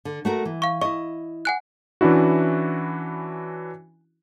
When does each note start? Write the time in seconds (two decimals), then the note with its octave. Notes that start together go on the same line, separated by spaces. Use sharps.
0.05 D3
0.25 A3 F#4 A#4
0.45 E3
0.62 F5 C#6
0.81 E4 D#5 C#6
1.45 F#5 G#5 F#6
2.01 E3 C#4 D4 E4 F#4